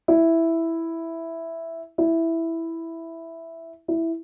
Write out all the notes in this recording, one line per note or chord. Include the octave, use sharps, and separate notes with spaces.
E4
E4
E4